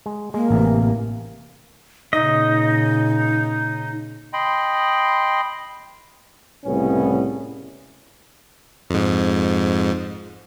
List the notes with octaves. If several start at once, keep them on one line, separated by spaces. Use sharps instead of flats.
G#3
G#3 A#3
A1 C3 E3
A#2 C#3 D#4 D#5
D#5 G5 B5 C6
C2 A2 C#3 B3 C#4
F2 G#2